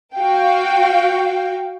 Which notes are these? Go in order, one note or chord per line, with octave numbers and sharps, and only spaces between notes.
F#4 F5 G5